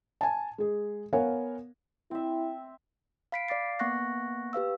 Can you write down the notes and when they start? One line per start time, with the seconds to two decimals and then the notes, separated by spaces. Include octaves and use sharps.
0.21 G#5 A5
0.58 G#3 G#4
1.13 B3 A#4 C#5 F5 F#5 G#5
2.11 C4 E4 E5
3.32 F5 B5 B6 C7 D7
3.48 D5 F5 D6 A6 C7
3.79 A#3 B3 F#5 C#6 F#6 A#6
4.53 G4 B4 F5 E6